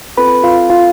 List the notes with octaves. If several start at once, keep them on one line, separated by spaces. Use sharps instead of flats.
C4 F4 A4 B4 B5
F4 F5
F4 F5